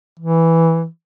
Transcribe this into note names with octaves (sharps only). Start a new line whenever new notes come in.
E3